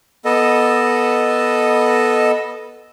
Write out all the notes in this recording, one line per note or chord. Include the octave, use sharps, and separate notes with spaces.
B3 A4 D#5